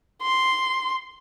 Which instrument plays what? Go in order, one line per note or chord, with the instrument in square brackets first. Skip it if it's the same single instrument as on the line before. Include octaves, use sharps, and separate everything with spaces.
[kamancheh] C6